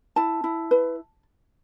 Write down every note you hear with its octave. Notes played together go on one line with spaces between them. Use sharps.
E4 A5
E4
B4